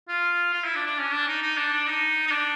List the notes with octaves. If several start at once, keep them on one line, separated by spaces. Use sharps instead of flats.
F4
F4
E4
D4
D4
C#4
D4
D#4
D#4
D4
D4
D#4
D#4
D4